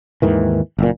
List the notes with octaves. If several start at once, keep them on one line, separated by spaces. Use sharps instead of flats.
D#2 G#2 D#3 E3
F#1 A#2